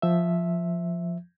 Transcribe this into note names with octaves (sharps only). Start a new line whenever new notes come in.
F3 E5